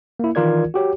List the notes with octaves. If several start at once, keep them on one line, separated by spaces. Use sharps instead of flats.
A#3 E4
D#3 E3 F4 A#4 D5 G#6
F#4 G4 C#5